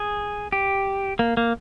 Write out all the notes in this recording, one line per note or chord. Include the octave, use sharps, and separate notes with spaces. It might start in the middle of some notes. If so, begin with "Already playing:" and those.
Already playing: G#4
G4
A#3
A#3